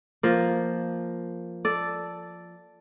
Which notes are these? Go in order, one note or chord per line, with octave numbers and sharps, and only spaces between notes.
F3 A#3
A4 D5